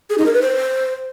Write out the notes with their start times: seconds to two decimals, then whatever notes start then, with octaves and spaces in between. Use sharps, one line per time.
0.10 G#4
0.18 D#4
0.26 A#4
0.34 B4
0.42 C5